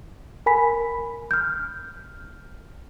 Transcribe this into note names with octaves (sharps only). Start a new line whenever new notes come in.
A#4 G#5 B5 B6
F6 G6